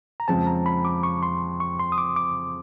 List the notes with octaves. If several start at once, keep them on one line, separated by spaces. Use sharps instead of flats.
A#5
F2 C#3 F3 G#3 C4 A5
A#5
B5
D6
C#6
C6
C#6
C6
D#6
D6
D6